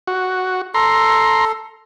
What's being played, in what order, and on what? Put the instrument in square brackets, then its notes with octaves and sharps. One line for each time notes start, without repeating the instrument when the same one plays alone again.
[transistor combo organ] F#4
[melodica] A4 [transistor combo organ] A#5 C6